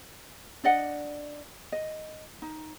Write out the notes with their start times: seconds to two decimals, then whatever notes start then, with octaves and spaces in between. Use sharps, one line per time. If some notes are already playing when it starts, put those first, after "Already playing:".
0.64 D4 D5 D#5 F#5
1.72 D#5
2.42 D#4